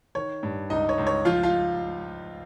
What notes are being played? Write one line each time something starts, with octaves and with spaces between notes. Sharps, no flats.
D#3 C#5
G2
C#2 D#4 D#5
C#5
C#2
C#5
F3 F4 F5
F4 F5